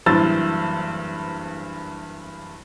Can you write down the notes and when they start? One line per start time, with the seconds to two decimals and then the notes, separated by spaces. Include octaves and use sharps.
0.06 F#1 G2 E3 C5 E6 A6